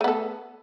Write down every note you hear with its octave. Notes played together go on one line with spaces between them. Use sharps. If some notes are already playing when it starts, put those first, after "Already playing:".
A3 B3 A4